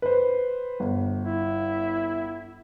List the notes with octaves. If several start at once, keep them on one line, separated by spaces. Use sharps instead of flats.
B4 C5
G1
E4